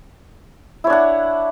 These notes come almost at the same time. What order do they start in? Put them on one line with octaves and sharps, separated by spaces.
E4 C#5 D4 F#5